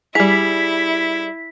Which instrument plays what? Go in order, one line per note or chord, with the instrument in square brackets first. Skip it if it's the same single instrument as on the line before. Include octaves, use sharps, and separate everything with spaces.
[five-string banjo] G3 G#4 [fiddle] E4 [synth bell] B6